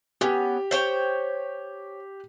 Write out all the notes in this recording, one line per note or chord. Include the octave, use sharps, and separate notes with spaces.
B3 C#4 G4
C5 C#5 G5